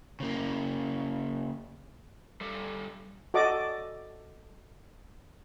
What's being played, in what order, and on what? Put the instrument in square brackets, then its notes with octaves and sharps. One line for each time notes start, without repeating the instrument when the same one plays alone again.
[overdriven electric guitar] C#3 A#3
[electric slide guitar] G3 A4
[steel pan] F#4 A4 D5 D#5 D6